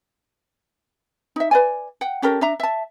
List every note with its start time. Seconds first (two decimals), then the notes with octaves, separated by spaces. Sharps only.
1.36 D#4 E5
1.51 B4 D5 G#5
2.01 F#5 G5
2.22 C#4 G4 A4 A#4
2.41 D4 E5 A#5
2.60 E5 A5